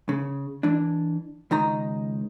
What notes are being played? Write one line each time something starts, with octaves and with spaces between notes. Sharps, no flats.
C#3
E3 D4
C#2 D#3 D#4 A#5